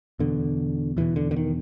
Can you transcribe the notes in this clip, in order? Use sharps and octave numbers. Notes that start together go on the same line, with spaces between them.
E2 B2 D3
E2 B2 E3
D3
D3
D#3